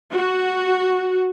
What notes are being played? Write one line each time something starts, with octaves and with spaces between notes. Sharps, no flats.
F#4